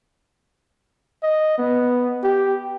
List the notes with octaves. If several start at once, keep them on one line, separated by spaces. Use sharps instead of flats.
D#5
B3
G4